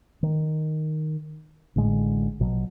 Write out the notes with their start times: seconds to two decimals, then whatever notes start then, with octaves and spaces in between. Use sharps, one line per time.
0.23 D#3
1.76 A1 A2 D3 G#3
2.40 A#1 B2 F#3